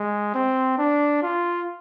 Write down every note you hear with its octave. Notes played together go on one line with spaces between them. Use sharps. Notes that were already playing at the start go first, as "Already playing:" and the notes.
Already playing: G#3
C4
D4
F4